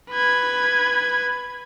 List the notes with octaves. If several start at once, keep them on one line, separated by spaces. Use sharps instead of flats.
B4 G#6